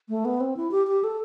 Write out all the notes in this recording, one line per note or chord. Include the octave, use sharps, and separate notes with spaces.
A3
B3
C4
E4
G4
G4
A4